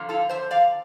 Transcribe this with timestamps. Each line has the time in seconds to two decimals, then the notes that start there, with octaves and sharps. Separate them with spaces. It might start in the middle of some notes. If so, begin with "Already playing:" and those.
Already playing: D3 F3 A#3
0.09 F4 A4
0.29 C5 E5
0.51 D5 F5